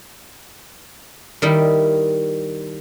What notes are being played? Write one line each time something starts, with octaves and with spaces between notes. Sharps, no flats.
D#3 G3 E4